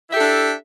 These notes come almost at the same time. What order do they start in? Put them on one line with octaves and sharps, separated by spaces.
E4 E5 G4 A4 D4